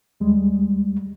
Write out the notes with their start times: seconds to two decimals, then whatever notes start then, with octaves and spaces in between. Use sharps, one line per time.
0.20 D#2 G3 G#3